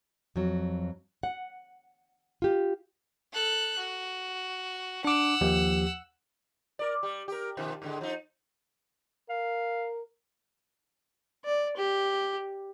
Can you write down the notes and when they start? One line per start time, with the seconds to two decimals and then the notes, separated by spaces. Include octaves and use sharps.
0.36 F2 F#3
1.23 F#5
2.42 F4 G4
3.33 A4 F#6
3.78 F#4
5.05 D4 F#5 D6 E6
5.41 D#2 F3 G4
6.79 A#4 D5
7.03 G3
7.28 G4 A#4
7.57 B2 D#3 F3
7.82 G#2 D3 G#3
8.01 F3 D#4
9.29 A#4 F5
11.45 D5
11.76 G4